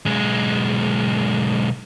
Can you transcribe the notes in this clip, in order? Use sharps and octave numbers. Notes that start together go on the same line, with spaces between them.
B1 G#3